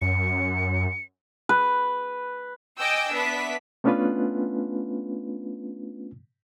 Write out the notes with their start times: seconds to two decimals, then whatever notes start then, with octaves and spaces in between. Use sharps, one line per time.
0.01 F#2 C#7
1.49 B4
2.78 D#5 G5 G#5 D6 E6 G6
3.11 B3 D4 B4 E5 B6
3.84 A3 B3 C#4 D4 F4 B4